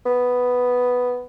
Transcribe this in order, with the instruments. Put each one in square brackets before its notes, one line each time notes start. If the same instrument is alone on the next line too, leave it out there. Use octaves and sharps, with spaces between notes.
[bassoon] B3